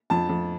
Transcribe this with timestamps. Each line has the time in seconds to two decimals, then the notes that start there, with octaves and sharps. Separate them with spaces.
0.10 F2 A5
0.29 F2